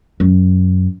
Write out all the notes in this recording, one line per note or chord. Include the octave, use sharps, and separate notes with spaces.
F#2